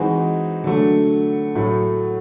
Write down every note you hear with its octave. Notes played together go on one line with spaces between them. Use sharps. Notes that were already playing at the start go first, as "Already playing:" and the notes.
Already playing: E3 G#3 C4 D#4 F#4
D3 F#3 A3
A2 F#3 A3